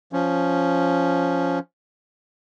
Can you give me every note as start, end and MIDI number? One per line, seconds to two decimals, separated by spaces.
0.13 1.59 53
0.13 1.59 61